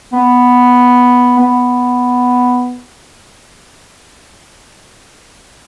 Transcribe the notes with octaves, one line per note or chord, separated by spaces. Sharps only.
B3
B3